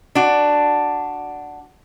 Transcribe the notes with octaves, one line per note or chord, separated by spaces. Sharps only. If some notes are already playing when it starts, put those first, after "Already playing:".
D4 F#4